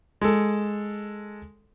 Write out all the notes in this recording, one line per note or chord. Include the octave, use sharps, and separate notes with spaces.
G#3 A4